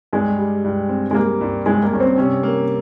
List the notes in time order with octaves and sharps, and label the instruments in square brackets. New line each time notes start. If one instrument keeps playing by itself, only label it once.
[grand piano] G2 [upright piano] G#3
[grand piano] G3
G2
C4
[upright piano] G#3
[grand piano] G3 [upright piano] A#3
[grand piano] G2
[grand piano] G2 [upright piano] G#3
[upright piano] A#3
[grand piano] G2 [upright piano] C#4
[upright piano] C4
[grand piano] C3 [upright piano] C#4
[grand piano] A#3